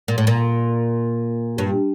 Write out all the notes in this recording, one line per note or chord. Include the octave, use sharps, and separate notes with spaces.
A#2
A2
A#2
G2